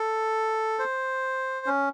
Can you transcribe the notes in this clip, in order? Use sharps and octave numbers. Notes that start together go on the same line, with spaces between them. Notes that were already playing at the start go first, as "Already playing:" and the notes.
Already playing: A4
C5
C#4